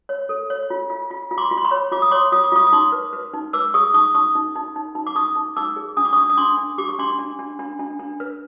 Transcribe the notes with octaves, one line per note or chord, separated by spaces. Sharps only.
C#5
A4
C#5
F4
F4
F4
F4
C6 D6
F4
C6
B5 C#6
C#5
F4 D6
D#6
C#5 C6 D6
F4 D#6
D6
F4 C#6 D#6
D#6
D#4 C6 D6
B4
B4
D#4
B4 D6 E6
G#4 C#6 D#6
D#4 C#6 D#6
D#4 C#6 D#6
D#4
D#4
D#4
D#4
D6
D#4 C#6 D#6
D#4
D#4 D6 E6
G#4
D4 D#6
D6
D4 C#6 D#6
D#6
D4 C6 D6
D4
G4 D6
C#6
D4 C6 D6
D4
D4
D4
D4
D4
B4